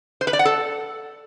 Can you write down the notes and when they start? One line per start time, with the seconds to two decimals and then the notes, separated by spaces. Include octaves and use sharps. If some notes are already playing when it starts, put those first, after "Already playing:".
0.21 C5
0.27 B4
0.33 D5
0.39 F#5
0.45 A4